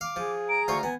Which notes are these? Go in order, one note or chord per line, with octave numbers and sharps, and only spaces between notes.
F5 D6
F3 G#4
A#5 D7
D2 F4 C5 C#6
B3 G#5